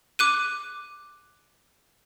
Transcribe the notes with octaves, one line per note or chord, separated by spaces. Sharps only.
D6 F#6 D#7